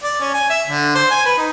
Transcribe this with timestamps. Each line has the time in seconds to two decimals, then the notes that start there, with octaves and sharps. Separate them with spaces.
0.03 D5
0.20 C#4
0.34 G#5
0.50 E5
0.68 D3
0.95 C5
1.11 G#5
1.25 B4
1.38 D#4